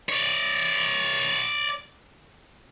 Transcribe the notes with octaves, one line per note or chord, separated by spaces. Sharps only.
C#5 D5